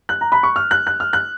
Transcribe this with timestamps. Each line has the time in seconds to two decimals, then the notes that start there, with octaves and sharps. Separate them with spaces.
0.09 F#6
0.21 A#5
0.32 B5
0.43 C#6
0.56 F6
0.71 F#6
0.87 F#6
1.00 F6
1.13 F#6